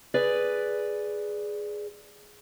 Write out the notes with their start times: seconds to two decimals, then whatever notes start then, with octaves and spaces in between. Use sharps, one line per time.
0.14 G#4 B4 D5